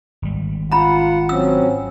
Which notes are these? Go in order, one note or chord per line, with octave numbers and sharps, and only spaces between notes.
G#1 G3
F4 F#5 A#5 B5
F#3 C4 C#4 E6